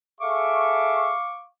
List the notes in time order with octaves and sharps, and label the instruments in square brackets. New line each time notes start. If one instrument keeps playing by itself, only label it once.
[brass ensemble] G#4 A4 E5 [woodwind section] F5 C#6 D6